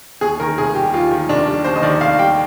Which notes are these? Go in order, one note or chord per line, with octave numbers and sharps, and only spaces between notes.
D#2 G#4
D#3 A#4
F1 G#4
G3 G4
D#2 F4
D#3
F1 D4
G3
D#2 C5
D#5
D#3 D5
F1 F5
G3 G5